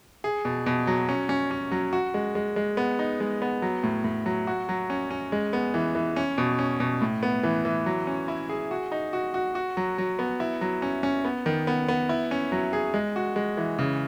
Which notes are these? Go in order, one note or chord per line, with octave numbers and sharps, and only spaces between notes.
G#4
B2
B2
F#3
C#4
C#4
C#4
F#3
F#4
G#3
G#3
G#3
B3
D#4
G#3
B3
F#3
A2
A2
F#3
F#4
F#3
C#4
C#4
G#3
B3
E3
E3
C#4
B2
C#4
B2
A2
B3
E3
E3
F#3
C#4
E4
G#4
F#4
D#4
F#4
F#4
F#4
F#3
F#3
B3
E4
F#3
C#4
C#4
B3
D#3
B3
B3
E4
C#4
F#3
G#4
G#3
F#4
G#3
E3
C#3